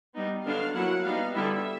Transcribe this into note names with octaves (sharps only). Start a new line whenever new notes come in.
G3 B3 D#4
D3 F#3 B3 D4 F5
F#3 A#3 C#4 E4 F#5
G3 B3 D#4 F5
D3 G3 B3 E4 E5